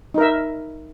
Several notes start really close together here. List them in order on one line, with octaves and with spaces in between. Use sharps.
D#4 A#4 E5